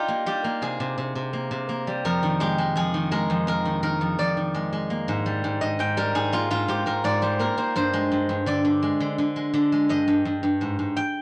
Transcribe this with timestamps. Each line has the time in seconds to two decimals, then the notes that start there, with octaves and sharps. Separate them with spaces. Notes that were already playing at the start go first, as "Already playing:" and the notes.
Already playing: G3 D#4 F4 G4
0.08 A#3
0.26 G3 G4
0.44 A#3
0.62 C3 G#4
0.80 C3
0.98 C3
1.15 C3
1.33 A#3
1.51 C3
1.69 A#3
1.87 G3
2.05 F2 A#4
2.23 D#3
2.40 G#3 G4
2.58 G#3
2.76 F2 G#4
2.94 D#3
3.12 G#3 A#4
3.30 F2
3.47 F2 A#4
3.65 D#3
3.83 D#3 A#4
4.01 F2
4.19 F2 D5
4.37 D#3
4.54 G#3
4.73 G#3
4.90 A#3
5.08 G#2
5.26 G3
5.44 G#2
5.61 G#2 D#5
5.79 G#2 G5
5.97 G3 A#4
6.15 G#2 G#4
6.33 A#3 F4
6.50 G#2 F4
6.68 G#2 G4
6.86 G#2 A#4
7.04 G#2 D5
7.22 G3 C5
7.39 A#3 A#4
7.57 A#3 C5
7.76 G2 C5
7.93 G#3
8.12 G2
8.29 G2
8.46 D3 D5
8.65 D3
8.83 G#3
9.00 D3
9.18 D3
9.36 G#3
9.54 D3
9.72 G#3
9.89 G2 D#5
10.08 G2
10.25 G2
10.43 G2
10.61 G#2
10.79 G#2
10.97 G5